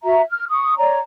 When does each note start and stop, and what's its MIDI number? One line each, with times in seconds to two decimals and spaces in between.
0.04 0.21 66
0.04 0.21 76
0.04 0.21 82
0.29 0.45 89
0.49 0.75 85
0.49 0.75 87
0.78 1.00 73
0.78 1.00 74
0.78 1.00 82